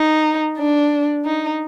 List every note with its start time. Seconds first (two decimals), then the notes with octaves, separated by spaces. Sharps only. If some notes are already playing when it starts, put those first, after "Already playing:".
Already playing: D#4
0.58 D4
1.25 D#4